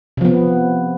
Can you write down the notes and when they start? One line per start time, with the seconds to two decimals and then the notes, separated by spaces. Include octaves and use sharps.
0.17 C3
0.21 F3
0.25 B3